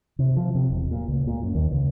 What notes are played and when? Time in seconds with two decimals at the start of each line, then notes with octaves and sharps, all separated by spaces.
0.19 C3
0.36 F3
0.55 C3
0.70 E1
0.91 A#2
1.08 C#2
1.27 A#2
1.43 F#2
1.55 D#2
1.72 C#2